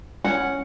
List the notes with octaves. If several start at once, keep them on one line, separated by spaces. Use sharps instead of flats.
C#4 F#5